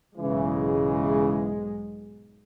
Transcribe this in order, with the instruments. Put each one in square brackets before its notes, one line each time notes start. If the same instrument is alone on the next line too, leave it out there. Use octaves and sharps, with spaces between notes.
[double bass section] B1 G#2 G#3 [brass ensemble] C#3 E3